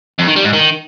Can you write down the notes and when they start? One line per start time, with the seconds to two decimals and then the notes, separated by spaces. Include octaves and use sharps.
0.19 F2
0.28 D#3
0.36 G3
0.45 G#2
0.53 D#3